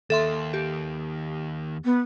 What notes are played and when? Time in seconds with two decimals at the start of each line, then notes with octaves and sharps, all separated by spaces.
0.10 D#2 A4 E5 C6
0.54 G4
1.84 B3